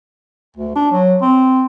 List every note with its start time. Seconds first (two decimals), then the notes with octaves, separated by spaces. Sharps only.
0.56 D2
0.75 D4
0.91 F#3
1.21 C4